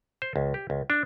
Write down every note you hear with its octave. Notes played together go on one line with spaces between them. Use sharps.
C5
C#2
G4
C#2
D4